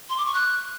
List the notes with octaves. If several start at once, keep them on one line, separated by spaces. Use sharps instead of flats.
C6
D6
C#6
F#6